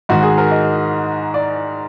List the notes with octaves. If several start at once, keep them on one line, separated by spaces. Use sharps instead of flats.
G#2 D#3 F#4
G#4
A#4
D#5
D5